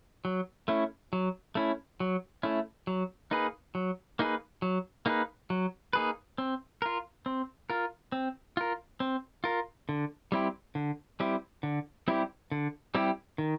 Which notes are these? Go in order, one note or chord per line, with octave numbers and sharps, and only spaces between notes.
F#3
A3 C#4 E4
F#3
A3 C#4 E4
F#3
A3 C#4 E4
F#3
A#3 D#4 G#4 B4
F#3
A#3 D#4 G#4 B4
F#3
A#3 D#4 G#4 B4
F#3
A#3 D#4 G#4 B4
C4
F4 A#4
C4
F4 A#4
C4
F4 A#4
C4
F4 A#4
D3
G3 C4 E4 G4
D3
G3 C4 E4 G4
D3
G3 C4 E4 G4
D3
G3 C4 E4 G4
D#3